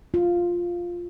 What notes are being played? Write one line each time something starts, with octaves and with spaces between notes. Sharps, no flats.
F4